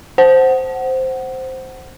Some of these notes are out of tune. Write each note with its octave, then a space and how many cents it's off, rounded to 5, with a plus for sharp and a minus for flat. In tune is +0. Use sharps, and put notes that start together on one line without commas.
C5 +0 F#5 +15